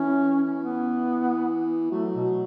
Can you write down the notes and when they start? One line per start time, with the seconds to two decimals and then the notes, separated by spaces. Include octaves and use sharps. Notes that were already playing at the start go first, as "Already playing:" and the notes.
Already playing: E3 C#4
0.59 B3
1.91 F#3 A3
2.14 B2